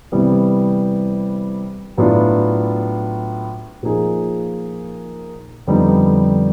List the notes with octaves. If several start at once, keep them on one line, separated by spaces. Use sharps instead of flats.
C3 E3 G3 B3
A2 F#3 B3 D4 F4
A#2 F3 A#3 D#4 G#4
F2 D3 G3 B3 D#4